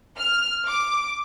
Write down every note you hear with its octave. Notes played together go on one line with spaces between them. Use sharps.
F6
D6